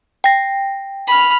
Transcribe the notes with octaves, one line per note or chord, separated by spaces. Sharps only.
G5 A#6
B5 F6